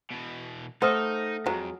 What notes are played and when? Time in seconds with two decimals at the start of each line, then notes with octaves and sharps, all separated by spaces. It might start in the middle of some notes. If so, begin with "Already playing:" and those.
0.11 B2 E3
0.82 A3 D#4 C5 F#5 D#6 F6
1.46 F2 F#3 G#3